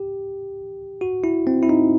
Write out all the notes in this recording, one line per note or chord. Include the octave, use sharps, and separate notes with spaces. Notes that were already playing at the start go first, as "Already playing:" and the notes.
Already playing: G4
F#4
E4
C4
E4
D#4